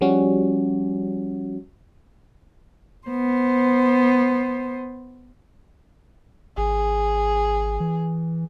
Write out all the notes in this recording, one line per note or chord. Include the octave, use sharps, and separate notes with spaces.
F3 G3 C#4 F#4
B3 C5
G#1 G#4
E3